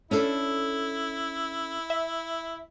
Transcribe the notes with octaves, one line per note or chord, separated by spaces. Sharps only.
C#4 D4 E4 A4
E5